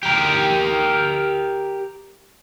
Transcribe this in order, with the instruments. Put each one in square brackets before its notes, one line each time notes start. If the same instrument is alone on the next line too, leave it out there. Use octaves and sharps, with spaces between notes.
[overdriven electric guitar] G4 A#4